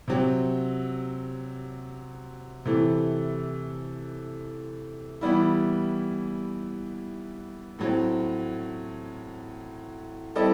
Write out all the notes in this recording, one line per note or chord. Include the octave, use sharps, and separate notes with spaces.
C3 F#3 C4
C3 E3 A3
E3 G3 B3 E4
A2 F#3 C4
G3 C4 E4 A4 D#5